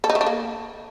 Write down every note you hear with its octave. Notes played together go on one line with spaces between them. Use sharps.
A4
D#4
A3
D4
A#3